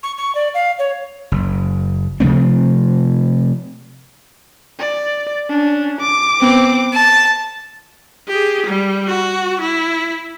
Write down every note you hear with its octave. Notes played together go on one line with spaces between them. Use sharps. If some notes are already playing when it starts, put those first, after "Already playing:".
C#6
C#6
D5
F5
C#5
F#1
C3 F3 A3 C4
D5
C#4 D4
D6
B3 C4
A5
G4 G#4
G3
F#4
E4